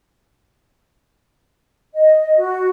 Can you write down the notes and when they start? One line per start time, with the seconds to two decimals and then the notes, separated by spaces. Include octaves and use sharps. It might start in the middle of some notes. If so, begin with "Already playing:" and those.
1.95 D#5
2.37 F#4